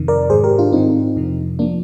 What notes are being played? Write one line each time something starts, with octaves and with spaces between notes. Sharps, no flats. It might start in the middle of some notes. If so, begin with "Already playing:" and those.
Already playing: F2 C3 D#3
A#4 D5
G#2 D#3 G#4 C5
G4 A#4
D4 F4
G#2 D#3 C4 D#4
F2 C3 F3
F3 A#3 D4